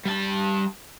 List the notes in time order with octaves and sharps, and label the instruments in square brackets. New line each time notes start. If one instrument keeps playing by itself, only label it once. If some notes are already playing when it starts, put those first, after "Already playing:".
[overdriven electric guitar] G3 A5